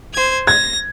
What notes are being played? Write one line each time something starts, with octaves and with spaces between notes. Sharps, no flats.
C5 G#6
G#6 A#6